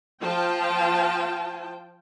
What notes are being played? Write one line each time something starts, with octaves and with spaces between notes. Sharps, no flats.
F3 F4 G5 A5